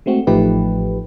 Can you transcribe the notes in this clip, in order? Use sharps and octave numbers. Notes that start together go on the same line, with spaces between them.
G#3 A3 C4 F#4
A1 F3 A3 D#4 G4 B4